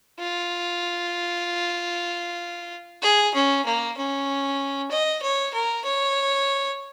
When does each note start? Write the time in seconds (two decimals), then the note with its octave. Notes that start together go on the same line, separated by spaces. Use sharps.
0.19 F4
3.02 G#4
3.35 C#4
3.65 A#3
3.97 C#4
4.91 D#5
5.22 C#5
5.54 A#4
5.85 C#5